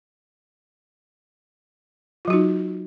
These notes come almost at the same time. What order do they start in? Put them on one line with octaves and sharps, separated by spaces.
F4 F#3 F#4 D#4